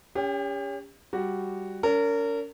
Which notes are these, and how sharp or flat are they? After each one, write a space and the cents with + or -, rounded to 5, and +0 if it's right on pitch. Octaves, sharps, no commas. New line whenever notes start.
C#4 +25 G4 +40 G5 +0
G3 +0 F#4 +0
C#4 +40 A#4 -25